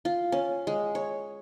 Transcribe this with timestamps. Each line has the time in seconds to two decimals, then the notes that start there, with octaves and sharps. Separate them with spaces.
0.05 F4
0.32 C#4
0.67 G#3
0.95 C#5